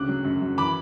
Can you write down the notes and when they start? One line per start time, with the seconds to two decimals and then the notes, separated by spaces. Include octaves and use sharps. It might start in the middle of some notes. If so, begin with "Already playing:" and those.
Already playing: D2 C#3 D6 F#6
0.08 F#3
0.24 F#2
0.41 F#2
0.58 E3 B5 D6